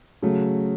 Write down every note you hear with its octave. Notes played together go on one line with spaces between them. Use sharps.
C#3 F#3 A3